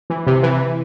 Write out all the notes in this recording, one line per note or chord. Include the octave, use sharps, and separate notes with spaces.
E3
C3
E3